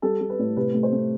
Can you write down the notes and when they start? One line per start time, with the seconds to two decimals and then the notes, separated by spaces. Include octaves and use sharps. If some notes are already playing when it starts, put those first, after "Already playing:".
0.02 G3 A4
0.21 G3
0.30 B4
0.39 A2
0.57 C3 B4
0.74 A3
0.83 C5
0.93 A3